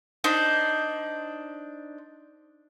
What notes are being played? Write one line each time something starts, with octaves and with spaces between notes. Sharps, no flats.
D4 D#4 C5